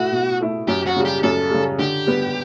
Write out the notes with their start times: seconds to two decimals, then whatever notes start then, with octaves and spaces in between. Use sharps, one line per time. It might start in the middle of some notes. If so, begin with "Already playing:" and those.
Already playing: B2 A3 E4 F#4
0.12 B2
0.41 A3 E4
0.68 F#2 G4
0.87 F#4
0.96 C#3 G3
1.05 G4
1.23 F#2 A4
1.51 C#3 G3
1.79 D3 G4
2.07 G3 B3